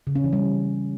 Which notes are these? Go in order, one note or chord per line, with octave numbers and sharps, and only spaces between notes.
C#3
C#4
E3
G3